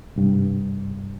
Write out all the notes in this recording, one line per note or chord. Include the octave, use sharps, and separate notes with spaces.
C2 G2